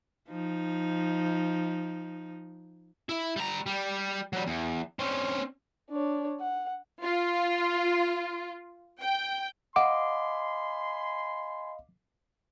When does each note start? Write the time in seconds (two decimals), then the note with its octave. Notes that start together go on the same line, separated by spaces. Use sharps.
0.29 F3 D#4
3.09 E4
3.36 G3 A#5
3.66 G3
4.33 F#3 G3
4.47 E2
4.99 C4 C#4
5.90 D4 C#5
6.40 F#5
7.04 F4
9.01 G5
9.76 D#5 F5 F#5 G#5 B5 C6 D6